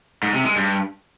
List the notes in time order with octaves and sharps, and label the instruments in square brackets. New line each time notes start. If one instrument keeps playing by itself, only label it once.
[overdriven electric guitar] G#2
C3
G#3
G2